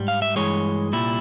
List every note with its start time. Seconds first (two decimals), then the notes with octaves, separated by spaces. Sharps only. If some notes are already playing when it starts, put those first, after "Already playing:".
Already playing: G#2 G3
0.08 F5
0.22 E5
0.36 G2 E3 G#3 C#5
0.93 C2 A#2 G3 E4